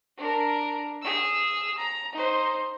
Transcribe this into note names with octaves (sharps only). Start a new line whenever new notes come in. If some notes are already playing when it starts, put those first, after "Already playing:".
D4 A#4
G#4 E6
A#5
D#4 C5